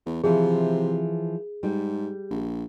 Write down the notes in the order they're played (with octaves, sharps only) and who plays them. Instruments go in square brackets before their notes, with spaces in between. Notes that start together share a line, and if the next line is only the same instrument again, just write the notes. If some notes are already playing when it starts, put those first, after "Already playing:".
[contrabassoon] E2
[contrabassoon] C3 [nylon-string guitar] E3 F3 [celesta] G#4
[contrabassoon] G#2 [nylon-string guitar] G3
[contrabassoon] A#1